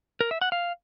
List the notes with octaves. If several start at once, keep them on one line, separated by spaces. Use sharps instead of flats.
A#4
E5
F#5
F5